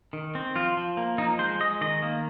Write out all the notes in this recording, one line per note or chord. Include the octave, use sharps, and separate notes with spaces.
D#3
C4
F3 F4
F3
A#3
F3 D#4
G#3 C5
G#3 D#5
D#3 D#5
A#3